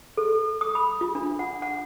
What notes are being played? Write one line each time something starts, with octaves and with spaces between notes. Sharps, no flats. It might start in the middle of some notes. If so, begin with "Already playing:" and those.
A4
D#6
B5
F4
D4
F#5
F#5